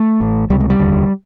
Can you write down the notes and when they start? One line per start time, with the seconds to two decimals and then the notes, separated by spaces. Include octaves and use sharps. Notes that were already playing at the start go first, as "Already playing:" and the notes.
Already playing: A3
0.20 A1 A2
0.50 C#2 C3 G3
0.60 G#3
0.70 G3
0.79 F1 D#2 D3